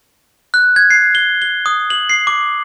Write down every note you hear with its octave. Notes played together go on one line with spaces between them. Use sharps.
F#6
G#6
C7
G7
G7
D#6
F#7
C7
D6